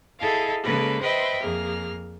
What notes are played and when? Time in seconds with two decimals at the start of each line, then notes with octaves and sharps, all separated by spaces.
0.20 E4 G#4 A4 D#5 F5 A5
0.63 C#3 G#3 A#3 A4 B4
1.01 B4 C5 D#5 E5 G5 C6
1.40 F2 A#3 G#4 F6